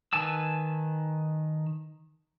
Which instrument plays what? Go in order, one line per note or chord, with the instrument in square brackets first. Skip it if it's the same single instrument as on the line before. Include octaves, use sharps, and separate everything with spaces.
[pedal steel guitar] D#3 B4 G#5 A5 E6